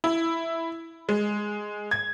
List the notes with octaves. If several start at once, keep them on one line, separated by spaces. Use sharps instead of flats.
E4
G#3
G#6